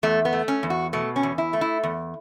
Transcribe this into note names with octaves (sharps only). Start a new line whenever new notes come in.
E2 A3
B3
A3
C#4
E2
F#4
B2 A3
C#4
E2
E4
A3
E4
E2